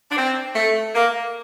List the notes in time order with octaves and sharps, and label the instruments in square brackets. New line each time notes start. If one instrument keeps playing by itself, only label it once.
[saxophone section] D4
C4
A3
A#3